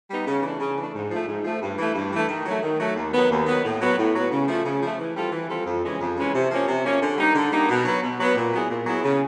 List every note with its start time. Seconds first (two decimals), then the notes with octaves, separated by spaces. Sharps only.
0.09 G3 B3 D#4
0.27 C#3
0.43 E3 A3 D4
0.60 C#3
0.78 E3 A3 D4
0.94 G#2
1.11 F3 A3
1.28 G#2
1.45 F3 A3
1.61 G2
1.78 E3 A3
1.95 G2
2.12 E3 A3
2.29 D#3
2.46 F#3 A3
2.62 D#3
2.79 F#3 A3
2.96 D#2
3.13 D#3 F#3 B3
3.30 D#2
3.47 D#3 F#3 B3
3.64 A2
3.80 F#3 B3
3.97 A2
4.14 F#3 B3
4.31 C#3
4.47 F3 A3
4.65 C#3
4.81 F3 A3
4.99 E3
5.15 G3 C4 F4 A4
5.32 E3
5.49 G3 C4 F4 A4
5.66 F2
5.83 C#3 E3 G#3 C#4
6.00 F2
6.16 C#3 E3 G#3 C#4
6.33 C3
6.50 F3 A#3 C#4
6.67 C3
6.84 F3 A#3 C#4
7.01 D3
7.18 G3 A#3 D#4
7.35 D3
7.51 G3 A#3 D#4
7.69 B2
7.85 F#3 B3
8.02 B2
8.19 F#3 B3
8.35 A#2
8.53 F#3 B3 E4 G#4
8.70 A#2
8.86 F#3 B3 E4 G#4
9.03 C#3